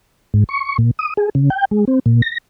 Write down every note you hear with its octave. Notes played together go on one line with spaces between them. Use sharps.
G#2
C#6
A#2
D#6
G#4
C#3
G5
G#3
C4
A#2
A#6